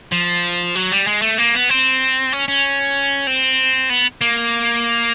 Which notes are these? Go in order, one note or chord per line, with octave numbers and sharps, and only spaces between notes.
F3
F#3
G3
G#3
A3
A#3
B3
C4
C#4
C#4
C4
B3
A#3